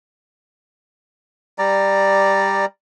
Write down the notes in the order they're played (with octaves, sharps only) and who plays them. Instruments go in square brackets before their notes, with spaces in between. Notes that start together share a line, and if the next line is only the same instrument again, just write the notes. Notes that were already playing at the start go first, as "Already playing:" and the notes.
[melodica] G3 D5 A#5